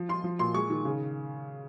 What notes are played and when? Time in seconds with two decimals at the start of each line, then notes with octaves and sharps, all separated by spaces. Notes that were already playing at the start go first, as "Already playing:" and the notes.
Already playing: F3
0.09 F4 C6
0.24 F3
0.39 A#2 C6
0.54 G#3 C#6
0.70 D#3
0.85 C#3